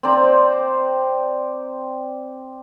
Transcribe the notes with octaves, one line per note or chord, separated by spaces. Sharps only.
C4 C5 D5 A#5